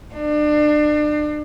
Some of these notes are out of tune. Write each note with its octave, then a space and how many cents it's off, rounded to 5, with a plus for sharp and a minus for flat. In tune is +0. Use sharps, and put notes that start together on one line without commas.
D4 +30